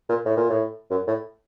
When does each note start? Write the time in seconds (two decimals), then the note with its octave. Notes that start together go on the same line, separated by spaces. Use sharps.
0.09 A#2
0.25 A2
0.37 A#2
0.50 A2
0.91 F#2
1.07 A2